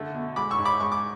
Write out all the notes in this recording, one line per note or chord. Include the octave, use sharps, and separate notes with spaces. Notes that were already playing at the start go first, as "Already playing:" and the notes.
Already playing: D3 A3
B2
G#3 B5 D6
C#6 E6
G#2
B5 D6
G#3 C#6
D6